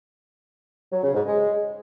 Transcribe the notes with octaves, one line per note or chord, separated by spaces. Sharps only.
F#3
C#3
G#2
G#3